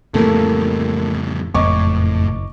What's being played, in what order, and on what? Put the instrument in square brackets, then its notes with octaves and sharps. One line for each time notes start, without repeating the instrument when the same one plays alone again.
[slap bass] F2 A2 E3 [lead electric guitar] C#3 G3 [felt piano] A3 A#3
[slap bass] F#1 [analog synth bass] F2 [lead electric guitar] A2 [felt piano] D#5 C#6 D6